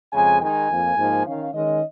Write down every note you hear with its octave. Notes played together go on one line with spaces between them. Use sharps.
F2 C#3 G#3 G#5
D#3 G#3 D#4 G#5
F2 F3 A#3
G#2 F3 A#3 D#4
D#3 C#4 F5
D#3 G#3 C#4 D#5